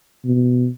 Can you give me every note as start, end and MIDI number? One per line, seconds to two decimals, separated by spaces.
0.25 0.68 47